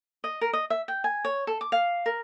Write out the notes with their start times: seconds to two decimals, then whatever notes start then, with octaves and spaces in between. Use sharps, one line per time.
0.24 D#5
0.41 A#4
0.53 D#5
0.70 E5
0.88 G5
1.04 G#5
1.25 C#5
1.47 A4
1.61 D6
1.72 F5
2.06 A#4